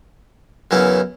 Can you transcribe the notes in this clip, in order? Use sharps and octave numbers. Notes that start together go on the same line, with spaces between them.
F#2 C#3 E3 B3 E4